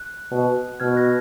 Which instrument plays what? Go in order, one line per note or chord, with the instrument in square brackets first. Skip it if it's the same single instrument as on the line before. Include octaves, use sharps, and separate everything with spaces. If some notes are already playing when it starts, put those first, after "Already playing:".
Already playing: [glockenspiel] F#6
[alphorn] B2
[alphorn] B2 [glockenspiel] F6 G#6
[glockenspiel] F#6 A#6